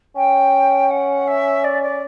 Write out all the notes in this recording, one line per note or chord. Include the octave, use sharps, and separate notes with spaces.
C#4 G5
F#5
E5
D5
D5